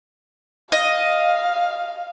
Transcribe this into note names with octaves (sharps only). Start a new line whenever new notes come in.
D#5 F5